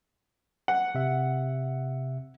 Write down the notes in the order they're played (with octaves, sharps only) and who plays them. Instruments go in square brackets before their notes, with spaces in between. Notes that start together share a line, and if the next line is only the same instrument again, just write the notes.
[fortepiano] F#5
[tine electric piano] C3 E5